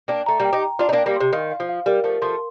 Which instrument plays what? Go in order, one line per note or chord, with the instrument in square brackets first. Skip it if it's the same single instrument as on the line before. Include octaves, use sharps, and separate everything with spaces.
[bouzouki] A#3 D4 [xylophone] G5
[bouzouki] A3 [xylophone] A#5
[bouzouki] G3 A#3
[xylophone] G5
[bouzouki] D#4 G4
[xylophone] A#5
[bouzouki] D4 F4 [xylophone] D5
[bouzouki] D#4
A#3 D4
[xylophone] G5
[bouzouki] G3 A#3
[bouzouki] C3 [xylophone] C6
[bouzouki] D#3 [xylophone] F5
[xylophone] F5
[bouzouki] F3
[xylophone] F5
[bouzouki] G3 [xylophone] A#4
[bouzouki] F3 A3 [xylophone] A#4
[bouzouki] F3 A3 [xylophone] C6